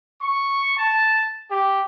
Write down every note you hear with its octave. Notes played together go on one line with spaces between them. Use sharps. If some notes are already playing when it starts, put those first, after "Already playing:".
C#6
A5
G4